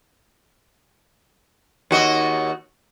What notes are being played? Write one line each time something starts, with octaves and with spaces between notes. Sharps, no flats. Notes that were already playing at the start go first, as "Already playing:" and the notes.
D#2 F#4 D#5